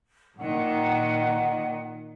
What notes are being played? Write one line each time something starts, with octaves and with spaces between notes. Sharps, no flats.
A#2 D#3 F#5